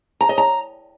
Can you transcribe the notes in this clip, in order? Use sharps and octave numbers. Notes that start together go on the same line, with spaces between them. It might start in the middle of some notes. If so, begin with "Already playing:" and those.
A#5
D#5
A#5